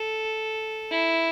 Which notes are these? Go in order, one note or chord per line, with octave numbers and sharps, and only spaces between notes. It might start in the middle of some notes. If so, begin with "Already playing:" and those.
Already playing: A4
E4